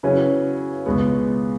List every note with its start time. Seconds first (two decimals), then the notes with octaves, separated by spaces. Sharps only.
0.03 C#3 F#3 C#4 E4 B4
0.86 C#2 B2 G#3 B3